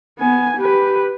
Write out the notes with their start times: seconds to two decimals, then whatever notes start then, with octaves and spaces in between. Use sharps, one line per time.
0.18 B3 G#5
0.57 G4 B4